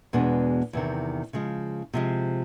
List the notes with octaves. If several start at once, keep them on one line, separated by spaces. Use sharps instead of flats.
E2 B2 G#3 B3 D4
E2 C3 D#3
C#3 F3 G#3
C3 F3 G#3